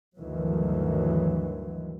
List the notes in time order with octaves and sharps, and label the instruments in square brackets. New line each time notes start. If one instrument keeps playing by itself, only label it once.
[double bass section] D2 G2 D#3 E3 F#3